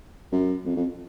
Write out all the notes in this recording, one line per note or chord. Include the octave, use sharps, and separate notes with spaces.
F#2
F2
F2